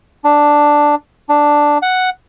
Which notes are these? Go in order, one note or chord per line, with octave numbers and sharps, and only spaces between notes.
D4
D4
F#5